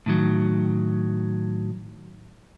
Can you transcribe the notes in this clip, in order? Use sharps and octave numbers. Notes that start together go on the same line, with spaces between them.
A2 D#3 F#3